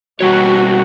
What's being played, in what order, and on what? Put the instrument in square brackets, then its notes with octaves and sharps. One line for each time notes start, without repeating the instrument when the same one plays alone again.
[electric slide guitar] B2 G3 C#5 [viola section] F#4